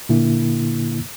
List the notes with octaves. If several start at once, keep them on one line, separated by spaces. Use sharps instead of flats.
A#2 D3 A#3 E4